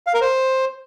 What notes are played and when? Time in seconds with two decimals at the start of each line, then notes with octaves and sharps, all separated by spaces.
0.07 F5
0.14 A#4
0.21 C5